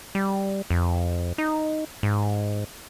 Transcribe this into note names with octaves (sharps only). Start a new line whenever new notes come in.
G3
F2
D#4
G#2